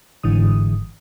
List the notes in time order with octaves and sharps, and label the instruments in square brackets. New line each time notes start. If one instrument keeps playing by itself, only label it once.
[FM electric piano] G1 G#2 D3 E3 D#6